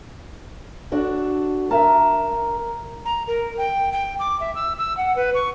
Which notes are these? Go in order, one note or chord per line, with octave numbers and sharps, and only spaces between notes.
D4 F#4 A4
A#4 E5 F5 A5
A#5
A#4
G5
G5
D6
E5
E6
E6
F#5
B4
C#6